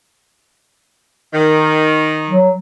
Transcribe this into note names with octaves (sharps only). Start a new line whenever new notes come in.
D#3
F#3